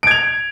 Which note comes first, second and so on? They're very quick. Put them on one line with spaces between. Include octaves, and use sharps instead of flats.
D7 G#6 F7